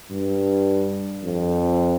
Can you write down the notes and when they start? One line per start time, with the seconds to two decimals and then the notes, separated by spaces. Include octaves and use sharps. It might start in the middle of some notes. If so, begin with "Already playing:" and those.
0.11 G2
1.24 F2